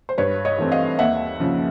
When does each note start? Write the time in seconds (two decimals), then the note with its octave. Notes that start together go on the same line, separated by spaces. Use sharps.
0.09 C5
0.18 G2 B4 C#5
0.45 C#5 D#5
0.58 E3 A3 C4
0.72 D#5 F5
0.99 D#2 E5 F#5
1.40 C#3 F3